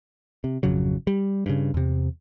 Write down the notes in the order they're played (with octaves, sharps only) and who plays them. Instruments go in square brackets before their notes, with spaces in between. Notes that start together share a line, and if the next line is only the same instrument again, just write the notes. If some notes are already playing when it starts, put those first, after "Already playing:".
[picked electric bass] C3
G#1 F2 C#3 F#3
G3
G2 C#3
E2 C3